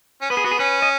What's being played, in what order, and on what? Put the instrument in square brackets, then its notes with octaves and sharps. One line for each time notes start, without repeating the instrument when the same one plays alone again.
[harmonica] C#4
[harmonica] B3 [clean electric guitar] B4
[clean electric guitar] G#4
[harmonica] B3 [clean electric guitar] F#4
[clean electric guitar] G#4
[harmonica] C#4 [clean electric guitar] B4
[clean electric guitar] D#5